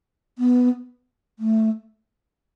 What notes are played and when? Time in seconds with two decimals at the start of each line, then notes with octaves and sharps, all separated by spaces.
0.39 B3
1.39 A3